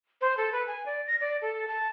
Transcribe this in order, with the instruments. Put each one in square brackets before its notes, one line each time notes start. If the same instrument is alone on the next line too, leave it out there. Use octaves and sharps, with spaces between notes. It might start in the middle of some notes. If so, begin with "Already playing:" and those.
[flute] C5
A4
B4
G#5
D5
A#6
D5
A4
A5